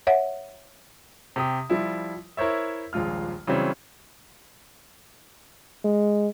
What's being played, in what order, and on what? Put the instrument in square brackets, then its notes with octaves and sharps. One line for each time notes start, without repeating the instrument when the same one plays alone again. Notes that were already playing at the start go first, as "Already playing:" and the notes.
[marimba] C#5 E5 F#5
[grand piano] C3 G4 D#6
F3 G3 E4
E4 A#4 C5 C#5 E5
D#1 A#1 G#3 F4 F6
C#3 E3 F#3 G3 C4 C#4
[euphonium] G#3